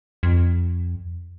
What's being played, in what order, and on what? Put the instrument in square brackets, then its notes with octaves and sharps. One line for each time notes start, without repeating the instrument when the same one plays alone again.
[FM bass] F2